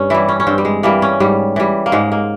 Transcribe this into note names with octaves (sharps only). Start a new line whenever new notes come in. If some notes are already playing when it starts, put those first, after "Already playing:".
Already playing: G2 C#4
E3 G3 E4
C#4
C#4
G2 C4
G3
G#3
E3 G3 A#3
C#4
G#2 G3
E3 G3
A#3
G#2 G#3
A#3